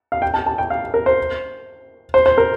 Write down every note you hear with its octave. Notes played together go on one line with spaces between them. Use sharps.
F5
G5
A5
A5
G5
F5
A#4
C5
C5
C5
A#4